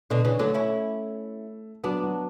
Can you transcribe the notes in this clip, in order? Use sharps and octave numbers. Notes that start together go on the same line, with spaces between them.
B2 D3 D4 D5
C#3 E3
D3 F#3 A3 A4
C#4 E4
F#3 B3 D4 F#4
F#3 F#4